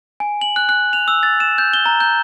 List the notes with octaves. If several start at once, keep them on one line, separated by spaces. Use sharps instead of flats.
G#5
F#7
F#6
F#6
F7
E6
A6
E7
G6
G7
A#5
G6